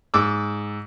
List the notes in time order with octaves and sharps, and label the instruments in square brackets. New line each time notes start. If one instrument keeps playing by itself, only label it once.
[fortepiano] G#2 D6 E6